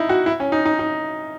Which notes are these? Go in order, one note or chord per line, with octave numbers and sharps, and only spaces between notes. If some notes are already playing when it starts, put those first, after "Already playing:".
Already playing: D#4 E4
F#4
E4
C#4
D#4
D#4
D#4